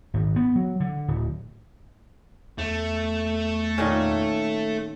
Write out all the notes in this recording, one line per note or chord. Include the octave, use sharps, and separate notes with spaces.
G#1
B3
F#3
D3
D1
E2 A3
A#2 D#3 C#4